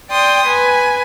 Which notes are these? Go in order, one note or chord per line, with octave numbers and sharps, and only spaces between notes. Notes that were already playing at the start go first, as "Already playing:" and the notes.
D5 G5 C6 D#6
B4 G#5